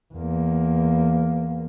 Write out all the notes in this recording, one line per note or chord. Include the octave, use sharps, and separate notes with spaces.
E2 A#3